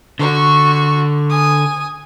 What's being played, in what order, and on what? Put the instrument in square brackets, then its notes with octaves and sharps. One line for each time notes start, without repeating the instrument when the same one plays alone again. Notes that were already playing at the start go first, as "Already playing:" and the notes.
[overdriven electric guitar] D3 [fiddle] F#4 C#6
[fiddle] G#5 D#6